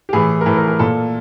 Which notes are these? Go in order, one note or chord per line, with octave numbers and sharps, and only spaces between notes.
G4
A2 E3 G#4
A#4
A2 E3 A4
A#4
A#4
A#2 A4